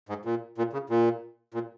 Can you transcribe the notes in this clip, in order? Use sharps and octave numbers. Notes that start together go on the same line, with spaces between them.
G#2
A#2
A#2
C#3
A#2
A#2